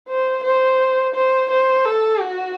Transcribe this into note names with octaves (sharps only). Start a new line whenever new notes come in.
C5
C5
C5
C5
A4
F#4